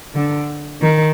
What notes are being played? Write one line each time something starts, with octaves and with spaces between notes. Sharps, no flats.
D3
D#3